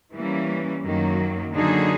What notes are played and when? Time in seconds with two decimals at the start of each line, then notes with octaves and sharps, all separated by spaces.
0.14 E3 G3 A#3 C#4
0.83 F#2 D#3 F#3 A#3
1.53 D3 F#3 A#3 D#4 G#4